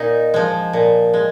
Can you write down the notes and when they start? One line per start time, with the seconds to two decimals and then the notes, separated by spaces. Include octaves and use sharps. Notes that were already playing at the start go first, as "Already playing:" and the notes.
Already playing: A#2 D#4
0.34 F3 G#3
0.73 A#2
1.14 G#3